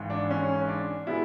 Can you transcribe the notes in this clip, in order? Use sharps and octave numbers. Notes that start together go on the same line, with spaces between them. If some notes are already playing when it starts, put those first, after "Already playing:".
Already playing: G#1 G#2 E3
D4
C#4
D4
B2 G#3 B3 E4